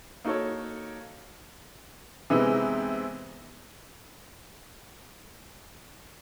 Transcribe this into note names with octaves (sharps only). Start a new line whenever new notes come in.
A#3 D#4 F#4 A4 C#5
C3 E3 G#3 B3 D#4